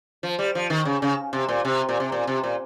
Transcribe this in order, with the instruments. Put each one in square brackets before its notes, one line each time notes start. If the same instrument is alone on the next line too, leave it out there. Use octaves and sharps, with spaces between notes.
[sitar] F3
G3
F3
D#3
C#3
C#3
C3
A#2
C3
A#2
C3
A#2
C3
A#2